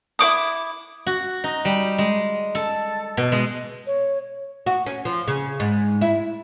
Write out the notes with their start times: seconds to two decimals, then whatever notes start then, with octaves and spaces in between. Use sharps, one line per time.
0.19 E4 C#5 D6 D#6
1.06 F#4
1.44 D#4
1.65 G3
1.98 G#3
2.55 A4
3.17 B2
3.32 G#3
3.87 C#5
4.66 F#4
4.86 C#4
5.05 F3
5.28 C#3
5.60 G#2
6.01 E4